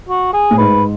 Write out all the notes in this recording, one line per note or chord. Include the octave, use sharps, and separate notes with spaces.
F#4
G#4
A2
G#2 B4